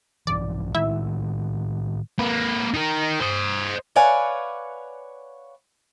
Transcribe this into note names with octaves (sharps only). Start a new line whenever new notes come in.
A#1 G2 E3 D5
A2 D#3 G#3 E4 E5
A#3 B4
D#4 A#4
C5 D#5
B4 C#5 D5 F5 F#5 G#5